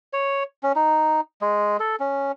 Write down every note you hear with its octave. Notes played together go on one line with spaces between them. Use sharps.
C#5
C#4
D#4
G#3
A4
C#4